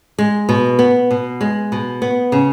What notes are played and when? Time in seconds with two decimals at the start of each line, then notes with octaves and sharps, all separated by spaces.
0.18 G#3
0.49 B2
0.79 B3
1.11 B2
1.41 G#3
1.72 B2
2.02 B3
2.32 C#3